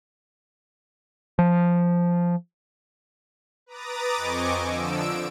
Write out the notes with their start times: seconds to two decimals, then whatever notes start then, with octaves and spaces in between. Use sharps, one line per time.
1.39 F3
3.66 B4 A#5 D6 D#6 A6
4.16 F2 C4 D#5 G#5 C#6 D6
4.58 D3 F3 E6 D7